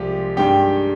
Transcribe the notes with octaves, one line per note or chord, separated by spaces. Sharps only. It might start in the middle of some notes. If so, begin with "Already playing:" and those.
Already playing: C2 F3 G#3 G4
G2 D#3 G#3 G4 G5